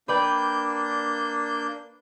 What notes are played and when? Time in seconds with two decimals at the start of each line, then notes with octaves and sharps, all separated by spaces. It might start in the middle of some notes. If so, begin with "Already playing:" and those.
0.08 A#3 D4 B4 D5 G5 G6